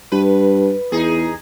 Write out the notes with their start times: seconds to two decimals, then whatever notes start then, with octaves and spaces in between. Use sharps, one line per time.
0.12 G2 B4
0.92 E2 D#4 G#4